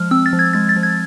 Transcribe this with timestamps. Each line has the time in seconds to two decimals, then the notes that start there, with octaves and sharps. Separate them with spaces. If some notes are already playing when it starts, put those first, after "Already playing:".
Already playing: F3 G#3 F6
0.11 C4 E6
0.26 A6
0.33 F3
0.39 G#6
0.54 G#3 A6
0.69 A6
0.76 F3
0.83 G#6